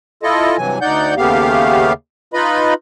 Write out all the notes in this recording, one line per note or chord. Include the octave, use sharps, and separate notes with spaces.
E4 F4 A4 D#5
G2 C3 E3 F#3 G#5
D2 D#4 D5 F#5 G6
D#2 C#3 A3 B3 G4 F5
D#4 F4 B4 D#5 B5